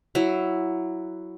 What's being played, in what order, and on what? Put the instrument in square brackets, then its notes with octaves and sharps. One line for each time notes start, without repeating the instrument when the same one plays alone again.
[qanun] F#3 E4